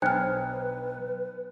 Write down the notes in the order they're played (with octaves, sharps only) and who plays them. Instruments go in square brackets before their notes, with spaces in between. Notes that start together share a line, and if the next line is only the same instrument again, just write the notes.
[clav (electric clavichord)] B1 [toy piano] D4 C5 G5 [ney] B4 [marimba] F6 F#6